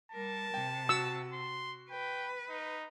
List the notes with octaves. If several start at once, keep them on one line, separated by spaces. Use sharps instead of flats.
G3 A#4 A5
C3 G5
F#4 E6 C#7
C6
B4 G5
D#4